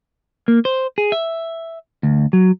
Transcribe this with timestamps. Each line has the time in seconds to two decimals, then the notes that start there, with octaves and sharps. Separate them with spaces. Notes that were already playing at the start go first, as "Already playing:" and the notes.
0.48 A#3
0.65 C5
0.98 G#4
1.12 E5
2.03 D2
2.33 F#3